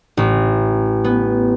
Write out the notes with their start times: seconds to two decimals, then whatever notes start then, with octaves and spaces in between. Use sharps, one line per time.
0.17 A1
1.04 B3